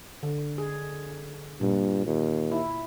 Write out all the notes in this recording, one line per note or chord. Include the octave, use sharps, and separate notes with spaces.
D3
G#4
G2 A#2
D#2
E4